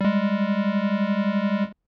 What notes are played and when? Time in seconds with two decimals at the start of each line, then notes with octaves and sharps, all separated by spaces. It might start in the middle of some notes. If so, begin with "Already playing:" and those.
0.01 G3 G#3